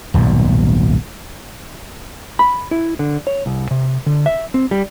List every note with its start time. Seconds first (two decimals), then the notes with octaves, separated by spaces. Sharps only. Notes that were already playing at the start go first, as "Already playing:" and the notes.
0.14 D#1 B1 G#2 B2
2.39 B5
2.71 E4
2.99 D3
3.27 C#5
3.46 C2
3.71 C3
4.06 D3
4.26 E5
4.54 C4
4.71 G3